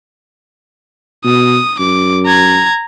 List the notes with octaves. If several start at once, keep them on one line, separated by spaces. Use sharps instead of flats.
B2 D#6
F#2 D6
A#5 G#6